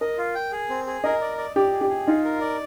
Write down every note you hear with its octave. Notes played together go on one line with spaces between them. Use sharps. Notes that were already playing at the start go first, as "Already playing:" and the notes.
A#4 D#5
F4
G5
G#4
C4
G#4
A#4 D#5
D5
D5
G4 D5
G#4
G4
G#4
D#4 F4
A#4
D5